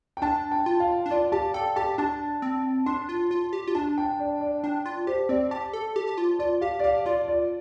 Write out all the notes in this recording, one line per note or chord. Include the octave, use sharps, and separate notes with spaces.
G5
D4 A5
G5
F4
F5
D4
F4 D5
G4 A5
A4 G5
G4 A5
D4 A5
C4
D4 C6
F4
F4
G4
F4
D4 A5
G5
D5
D5
D4 G5
F4
G4 C5
C4 D5
G4 A5
A4
G4
G4
F4
F4 D5
G4 F5
D5
G4 F5
F4 D5
D5